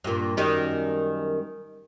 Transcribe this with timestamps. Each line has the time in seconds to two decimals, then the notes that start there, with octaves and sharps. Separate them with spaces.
0.04 G2 A#2
0.37 F#2 D#3 G3